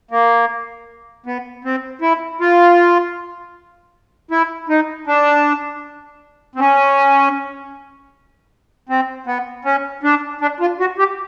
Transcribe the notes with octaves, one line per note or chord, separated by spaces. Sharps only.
A#3
B3
C4
E4
F4
E4
D#4
D4
C4
C#4
C4
B3
C#4
D4
D4
F4
F#4
G4